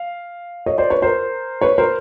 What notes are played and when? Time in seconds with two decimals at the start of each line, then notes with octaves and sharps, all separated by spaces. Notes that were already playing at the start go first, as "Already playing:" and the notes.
Already playing: F5
0.66 C#5 D#5
0.78 C5 D5
0.90 B4 C#5
1.02 A#4 C5
1.61 B4 C#5
1.78 A#4 C5